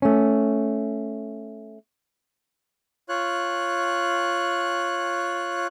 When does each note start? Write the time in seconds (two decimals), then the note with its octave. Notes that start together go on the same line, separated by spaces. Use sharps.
0.02 A3 C#4
3.09 F4 C#5 F#6